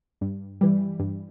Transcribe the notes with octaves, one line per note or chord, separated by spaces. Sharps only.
G2
E3 G3
G2